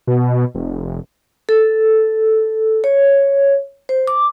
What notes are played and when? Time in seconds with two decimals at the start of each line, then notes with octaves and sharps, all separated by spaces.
0.07 B2
0.55 F1
1.49 A4
2.84 C#5
3.89 C5
4.07 D6